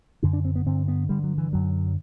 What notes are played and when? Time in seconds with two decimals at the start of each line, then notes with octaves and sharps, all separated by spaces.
0.22 F#2 D3 D4
0.33 D4
0.45 C4
0.55 B3
0.66 G2 D3 C4
0.88 B3
1.09 G2 D3 G3
1.24 F#3
1.38 E3
1.52 F#2 D3 F#3